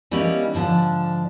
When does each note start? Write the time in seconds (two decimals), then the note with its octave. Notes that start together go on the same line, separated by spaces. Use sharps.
0.11 E3 G3 A#3 B3 C#4 D#4
0.53 G#2 D3 F3 D4